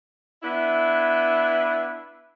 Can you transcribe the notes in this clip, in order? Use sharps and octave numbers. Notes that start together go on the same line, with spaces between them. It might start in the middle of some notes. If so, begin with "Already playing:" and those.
B3 D4 E4